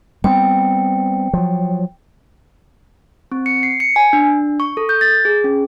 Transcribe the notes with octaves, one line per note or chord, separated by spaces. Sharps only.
G3 B3 C4 G5
F3 F#3
C4
C#7
C7
C#7
G#5
D4
C#6
A4
G6
A6
G#4
C#4